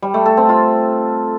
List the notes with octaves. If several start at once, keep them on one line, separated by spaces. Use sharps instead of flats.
G3
A3
A4
C4
F4